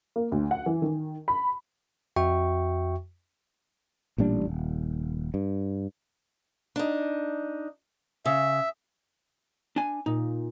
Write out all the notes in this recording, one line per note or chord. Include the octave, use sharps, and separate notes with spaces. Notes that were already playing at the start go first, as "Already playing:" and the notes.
A#3
D2
F#5
E3
D#3
B5
F2 F#4 E5 G5 C#6
A1 A#2 G3 D4
D#1
G2
D4 D#4
C#3 E5
D4 G#5
A#2 D#4